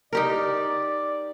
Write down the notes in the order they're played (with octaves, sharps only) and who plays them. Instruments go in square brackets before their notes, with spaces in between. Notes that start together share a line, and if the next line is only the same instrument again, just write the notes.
[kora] D#4 G4 A#4 [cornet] D5